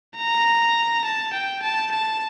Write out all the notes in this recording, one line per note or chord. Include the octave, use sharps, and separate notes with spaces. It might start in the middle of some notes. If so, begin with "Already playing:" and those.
A#5
A5
G5
A5
A5